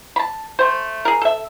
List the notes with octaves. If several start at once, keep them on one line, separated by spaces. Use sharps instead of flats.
A5 B5
A3 C5
G#4 A#4
A4 E5